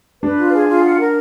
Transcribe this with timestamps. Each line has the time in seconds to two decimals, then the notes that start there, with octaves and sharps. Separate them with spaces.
0.23 D4 B4
0.38 F4
0.53 G#4
0.68 F4
0.84 F#5
1.00 A#4